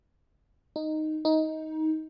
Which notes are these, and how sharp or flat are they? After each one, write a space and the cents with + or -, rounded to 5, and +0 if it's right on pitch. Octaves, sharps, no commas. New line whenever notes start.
D#4 -5
D#4 +15